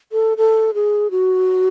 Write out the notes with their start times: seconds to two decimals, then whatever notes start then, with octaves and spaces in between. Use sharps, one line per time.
0.12 A4
0.37 A4
0.74 G#4
1.11 F#4